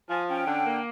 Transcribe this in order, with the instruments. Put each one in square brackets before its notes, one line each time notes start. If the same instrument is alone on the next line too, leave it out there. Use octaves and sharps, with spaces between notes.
[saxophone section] F3 [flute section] G#5
[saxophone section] C#4 [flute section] G5
[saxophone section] D3
A#3